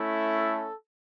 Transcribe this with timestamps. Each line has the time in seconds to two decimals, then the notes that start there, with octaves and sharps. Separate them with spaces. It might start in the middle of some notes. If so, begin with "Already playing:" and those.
Already playing: A3 C#4 E4
0.36 A4